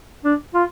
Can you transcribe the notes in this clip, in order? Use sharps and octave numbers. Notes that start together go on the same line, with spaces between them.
D4
F4